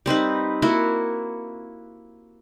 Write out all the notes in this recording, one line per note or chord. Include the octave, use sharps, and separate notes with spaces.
G3 C4 D#4 B4
A#3 E4 F#4